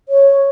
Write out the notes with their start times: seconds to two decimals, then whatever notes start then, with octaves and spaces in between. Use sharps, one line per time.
0.09 C#5